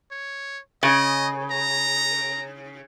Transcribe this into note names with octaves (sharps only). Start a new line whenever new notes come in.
C#5
C#3 D#5
A#5